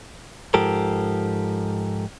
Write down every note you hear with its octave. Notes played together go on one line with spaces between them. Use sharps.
G#2 F3 G4 A4 A#4